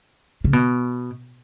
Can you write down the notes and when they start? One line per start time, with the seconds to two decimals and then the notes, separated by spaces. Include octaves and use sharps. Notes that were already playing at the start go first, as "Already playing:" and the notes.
0.44 C#3
0.53 B2